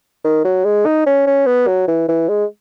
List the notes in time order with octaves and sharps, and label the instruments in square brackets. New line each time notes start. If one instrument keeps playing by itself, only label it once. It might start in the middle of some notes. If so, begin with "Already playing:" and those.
[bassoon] D#3
F#3
G#3
D#4
C#4
C#4
B3
F#3
E3
E3
G#3